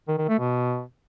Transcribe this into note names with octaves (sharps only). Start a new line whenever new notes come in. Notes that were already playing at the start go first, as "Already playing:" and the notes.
D#3
D#3
A3
B2